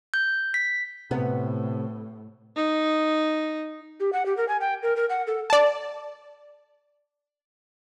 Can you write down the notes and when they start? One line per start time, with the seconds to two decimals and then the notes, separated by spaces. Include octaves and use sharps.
0.14 G6
0.54 B6
1.11 A2 C3 B3
2.56 D#4
4.00 G4
4.13 F#5
4.26 G4
4.37 A#4
4.48 G#5
4.60 G5
4.83 A#4
4.96 A#4
5.09 F#5
5.27 A4
5.50 D5 A5